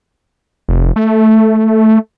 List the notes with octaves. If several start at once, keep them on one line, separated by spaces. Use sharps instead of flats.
F1
A3